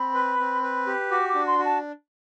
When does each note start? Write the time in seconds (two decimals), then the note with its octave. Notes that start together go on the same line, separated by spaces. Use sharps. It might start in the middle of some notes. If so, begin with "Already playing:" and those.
Already playing: C4 B5
0.14 B4
0.39 C4
0.63 B4
0.87 G4
1.11 F#4 D6
1.29 D6
1.35 D4
1.47 C6
1.59 F#4
1.65 A5